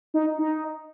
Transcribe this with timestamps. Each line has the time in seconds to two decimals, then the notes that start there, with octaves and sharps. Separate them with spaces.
0.14 D#4
0.39 D#4